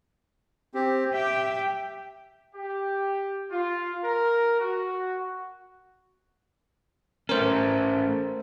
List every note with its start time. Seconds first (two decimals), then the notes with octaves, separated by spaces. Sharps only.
0.74 C4 G4
1.13 G4 E5 G5
2.54 G4
3.51 F4
4.03 A#4
4.60 F#4
7.29 A3 C#4 A#4 C5